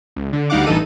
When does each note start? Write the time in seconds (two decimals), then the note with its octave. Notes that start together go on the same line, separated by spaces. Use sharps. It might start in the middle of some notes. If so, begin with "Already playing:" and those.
0.16 C#2
0.33 D3
0.50 D2 G3 D#4 F5 F#5 D6
0.66 A1 G2 E3 D#4 A4 D#7